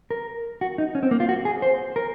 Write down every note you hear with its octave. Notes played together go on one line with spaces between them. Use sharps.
A#4
F#4
D#4
C#4
C4
A#3
F4
F#4
G#4
C5
A#4